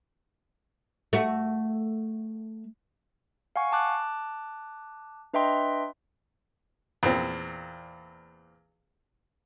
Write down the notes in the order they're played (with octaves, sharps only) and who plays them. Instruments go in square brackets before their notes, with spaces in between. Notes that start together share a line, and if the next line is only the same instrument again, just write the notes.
[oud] A3 F#4
[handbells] F5 F#5 G#5 C#6
A5 D6 F#6
D4 B4 D#5 E5 G5 C6
[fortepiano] E2 A#2 C4